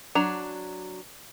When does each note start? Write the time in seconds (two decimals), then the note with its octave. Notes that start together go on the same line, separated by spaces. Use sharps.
0.15 F#3 D4 A#5